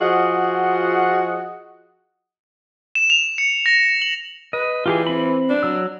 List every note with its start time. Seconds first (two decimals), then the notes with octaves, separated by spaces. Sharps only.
0.01 F3 F4 F#4 G#4 D#5 F#5
2.95 E7
3.10 F7
3.38 C#7
3.66 A#6
4.02 F#7
4.53 B4 D#5
4.86 E3 F4 G4 G#4
5.07 C4 B5
5.50 D4
5.63 F#3 E6